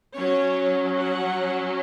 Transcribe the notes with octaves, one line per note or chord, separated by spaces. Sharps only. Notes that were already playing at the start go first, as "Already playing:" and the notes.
F#3 C#4 C#5
F#5